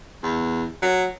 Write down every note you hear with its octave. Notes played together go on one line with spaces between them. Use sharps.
E2
F#3